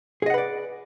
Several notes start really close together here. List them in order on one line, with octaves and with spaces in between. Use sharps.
G#4 D#5 F#5 B4 D5